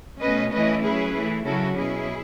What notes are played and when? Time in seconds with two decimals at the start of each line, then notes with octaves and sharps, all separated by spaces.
0.21 B2 A3 C#4 B4 D#5
0.53 E3 A3 C#4 E4 B4 D#5
0.83 F#3 C#4 E4 G#4 B4
1.14 E3 A3 E4
1.44 C#3 F#3 C#4 E4 F#4 A4
1.75 B2 F#3 C#4 E4 G#4